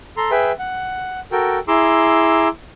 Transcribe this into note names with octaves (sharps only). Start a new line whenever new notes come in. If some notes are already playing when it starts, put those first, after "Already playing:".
A4 A#5 C6
G#4 B4 E5 G5
F#5
F#4 A4 A#4 G5
E4 G#4 A#5 C6 D6 E6